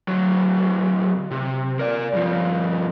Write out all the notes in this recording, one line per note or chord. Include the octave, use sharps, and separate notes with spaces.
D2 F#3
C3
A#4 D5
G2 F3